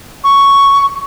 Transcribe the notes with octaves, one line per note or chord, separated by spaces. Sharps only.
C#6